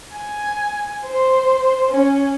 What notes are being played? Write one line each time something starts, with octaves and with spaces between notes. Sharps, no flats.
G#5
C5
C#4